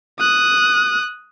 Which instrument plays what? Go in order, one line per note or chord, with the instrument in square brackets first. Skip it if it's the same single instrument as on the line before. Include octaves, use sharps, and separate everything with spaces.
[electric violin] D#6 F#6